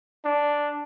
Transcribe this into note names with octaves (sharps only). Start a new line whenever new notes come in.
D4